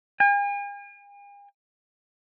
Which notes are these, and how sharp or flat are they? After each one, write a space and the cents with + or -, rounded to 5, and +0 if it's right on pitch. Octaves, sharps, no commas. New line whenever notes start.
G#5 -45